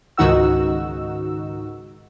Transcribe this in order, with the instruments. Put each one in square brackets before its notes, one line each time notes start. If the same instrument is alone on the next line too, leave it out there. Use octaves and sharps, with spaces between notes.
[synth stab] C#2 G#2 D#3 D#4 F#4 E6